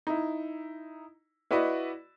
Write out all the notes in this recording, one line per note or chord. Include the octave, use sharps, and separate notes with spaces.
D#4 E4
E4 F#4 B4 D5 D#5 B5